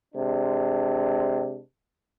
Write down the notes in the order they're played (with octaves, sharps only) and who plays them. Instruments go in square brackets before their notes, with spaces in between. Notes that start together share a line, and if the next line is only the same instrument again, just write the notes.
[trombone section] C3 G#3 D4